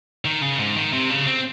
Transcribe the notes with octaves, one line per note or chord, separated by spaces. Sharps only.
D#3
C#3
G#2
D#3
C3
C#3
C4